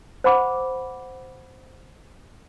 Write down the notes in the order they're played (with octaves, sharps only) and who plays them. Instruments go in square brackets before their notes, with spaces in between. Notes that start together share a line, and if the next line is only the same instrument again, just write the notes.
[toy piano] C5 F#5 B5 D6